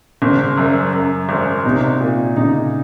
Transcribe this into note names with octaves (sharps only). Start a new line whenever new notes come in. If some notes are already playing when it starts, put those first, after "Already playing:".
G#1 C#3
F#2
F#2
G#1
C3 D#4
A#2
C#3 D#4